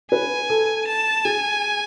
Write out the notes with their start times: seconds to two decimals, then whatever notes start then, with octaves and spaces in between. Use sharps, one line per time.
0.11 B4 G#5
0.50 A4
0.87 A5
1.25 G#4 G#5